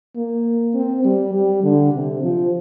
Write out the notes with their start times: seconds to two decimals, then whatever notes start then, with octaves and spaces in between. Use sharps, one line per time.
0.16 A#3
0.75 C4
1.04 G3
1.33 G3
1.63 D3
1.93 C3
2.23 F3